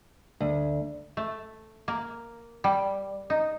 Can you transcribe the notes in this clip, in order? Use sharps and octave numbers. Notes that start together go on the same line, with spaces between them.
D2
A3
A#3
G3
D#4